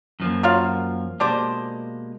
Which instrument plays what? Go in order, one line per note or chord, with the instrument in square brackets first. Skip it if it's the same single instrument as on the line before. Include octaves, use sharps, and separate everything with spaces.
[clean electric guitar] F#2 F3 A#3
[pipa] F#3 F4 F5
[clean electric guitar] B2 G#3 A#3 [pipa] D4 G4 C5